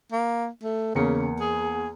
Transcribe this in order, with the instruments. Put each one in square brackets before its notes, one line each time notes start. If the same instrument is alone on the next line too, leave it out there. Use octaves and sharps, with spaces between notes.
[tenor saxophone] A#3
A3
[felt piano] E2 A#3 C#7 [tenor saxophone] C#3
[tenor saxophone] G#4